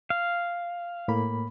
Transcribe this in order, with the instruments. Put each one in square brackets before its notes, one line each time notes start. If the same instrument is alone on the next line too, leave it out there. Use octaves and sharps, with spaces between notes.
[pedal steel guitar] F5
[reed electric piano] A2 A#3 B5